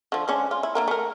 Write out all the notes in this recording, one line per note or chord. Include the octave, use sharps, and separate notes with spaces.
D3 F3
G#3 C#4 D4
F4
E4
D3 A#3 A#4
A3 A#4